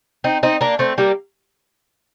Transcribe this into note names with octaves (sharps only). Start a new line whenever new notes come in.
C4 D#4
C4 D#4
A#3 D4
A3 C4
G3 A#3